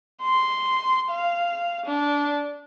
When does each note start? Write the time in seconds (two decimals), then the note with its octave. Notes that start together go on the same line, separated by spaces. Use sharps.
0.22 C6
1.10 F5
1.86 D4